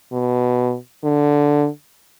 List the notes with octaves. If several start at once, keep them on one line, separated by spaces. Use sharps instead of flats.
B2
D3